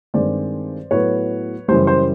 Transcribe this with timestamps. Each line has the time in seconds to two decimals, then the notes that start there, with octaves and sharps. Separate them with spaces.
0.14 G2 D#3 G#3 C4 C5 D5
0.91 A2 F#3 B3 B4 C#5
1.68 F#2 C#3 E3 G3 C5
1.87 C5